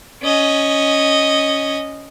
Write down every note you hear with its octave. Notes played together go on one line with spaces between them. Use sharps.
C#4 D#5